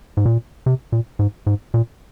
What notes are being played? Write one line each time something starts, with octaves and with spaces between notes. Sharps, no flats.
G#2
A#2
C3
A#2
G#2
G#2
A#2